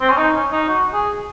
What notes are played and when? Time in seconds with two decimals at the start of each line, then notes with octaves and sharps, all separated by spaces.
0.01 C4
0.10 C#4
0.18 D#4
0.35 C#4
0.52 D#4
0.69 F#4
0.93 G#4